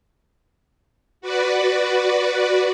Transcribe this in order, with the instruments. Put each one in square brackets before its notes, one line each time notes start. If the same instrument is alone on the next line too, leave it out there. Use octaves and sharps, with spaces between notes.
[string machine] F#4 B4 D5